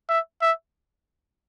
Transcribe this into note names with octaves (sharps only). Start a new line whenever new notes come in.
E5
E5